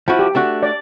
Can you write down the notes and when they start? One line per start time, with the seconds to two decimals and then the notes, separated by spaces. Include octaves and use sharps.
0.08 F3 E4 F#4
0.19 G4
0.35 A3 D4 F#4
0.63 D5